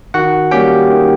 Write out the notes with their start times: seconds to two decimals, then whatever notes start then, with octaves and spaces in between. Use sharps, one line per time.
0.14 D#3 F#4 F#5
0.51 G3 A#3 C#4 G4 G5
0.90 D#3